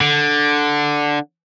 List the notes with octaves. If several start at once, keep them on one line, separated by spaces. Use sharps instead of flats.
D3